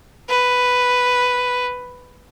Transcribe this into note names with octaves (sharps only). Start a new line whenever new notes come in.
B4